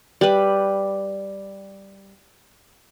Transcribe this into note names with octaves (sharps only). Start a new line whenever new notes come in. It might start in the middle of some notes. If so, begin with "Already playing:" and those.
G3 B4